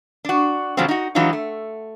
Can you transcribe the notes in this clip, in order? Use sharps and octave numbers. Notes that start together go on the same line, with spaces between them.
D4 F#4
B2 D3 F3 F#3 G#3 C4
D#4 F#4
E3 F#3 G#3 D#4 F4
A3